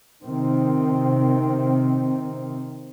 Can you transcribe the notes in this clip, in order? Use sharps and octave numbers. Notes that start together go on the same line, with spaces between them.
C3 D#3 C4